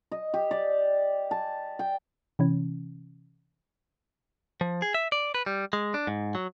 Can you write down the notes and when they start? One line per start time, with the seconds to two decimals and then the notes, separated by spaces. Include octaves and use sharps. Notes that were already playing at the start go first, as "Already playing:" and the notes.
0.11 D#5
0.34 G4
0.51 D5
1.31 A5
1.79 G5
2.39 C3 E3 C#4
4.61 F3
4.82 G#4
4.94 E5
5.12 D5
5.35 B4
5.46 G3
5.73 G#3
5.94 D4
6.07 G#2
6.35 F#3